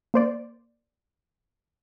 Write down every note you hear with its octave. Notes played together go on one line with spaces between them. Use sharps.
A#3 C5 D5